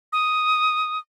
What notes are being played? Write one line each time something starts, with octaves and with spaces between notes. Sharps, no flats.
D#6